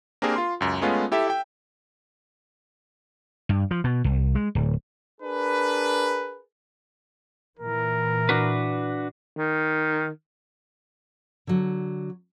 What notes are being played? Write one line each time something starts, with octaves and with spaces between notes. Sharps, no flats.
A#3 C4 D4 G4 G#4 A#4
F4 C6
C#2 F#2
G#3 A3 B3 C#4 F4
E4 G4 A4 E5
E5 G5
G2
F3
B2
C2
G#3
D1
D4 G#4 A#4 B4
A#2 E3 A#4
D4 F#4 B4
D#3
D3 F#3